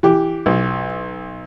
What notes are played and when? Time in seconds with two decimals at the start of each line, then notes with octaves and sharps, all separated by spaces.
0.03 E3 G4
0.46 B1